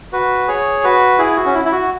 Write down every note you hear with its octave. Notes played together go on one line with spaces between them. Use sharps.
F#4 B4
G#4 C#5
F#4 B4
E4 G#4
F#4
C#4
E4
E4
F#4